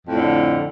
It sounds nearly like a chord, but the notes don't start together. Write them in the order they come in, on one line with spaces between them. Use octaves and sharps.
F2 A2 D3